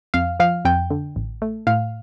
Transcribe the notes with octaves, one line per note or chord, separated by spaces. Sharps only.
F2 F5
F3 F5
F2 G5
D3
A1
A3
A2 F5